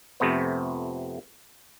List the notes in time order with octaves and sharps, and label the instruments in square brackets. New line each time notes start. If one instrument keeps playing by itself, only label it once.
[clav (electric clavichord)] F2 C3 A3 B3 C5